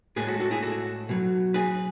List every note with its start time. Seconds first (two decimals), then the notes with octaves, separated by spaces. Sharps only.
0.16 A2 G#3 G#4 B4
0.28 F#4 A4
0.40 F#4 A4
0.51 E4 G#4
0.62 F#4 A4
1.09 B2 F#3
1.54 G#4 B4